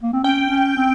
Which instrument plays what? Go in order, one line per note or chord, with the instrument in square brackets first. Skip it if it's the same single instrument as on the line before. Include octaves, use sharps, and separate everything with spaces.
[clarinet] A#3
C4
[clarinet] C#4 [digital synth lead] G5
[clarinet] C#4
C4